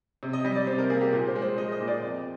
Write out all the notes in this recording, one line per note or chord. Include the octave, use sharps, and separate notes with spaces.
C3
D#5
G3 D#5
D5
C3 C5
A#4
A#3 G#4
G4
A#2 G#4
C5
G#3
C5
G#3 D#5
D#5
A#2
D5
F2